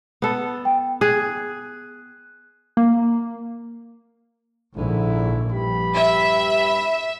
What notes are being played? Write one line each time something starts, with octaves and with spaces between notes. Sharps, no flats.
B3 A4
G5
G#4 F#6
A#3
A#1 G#2 D3 E4
G2 G4 B5
E5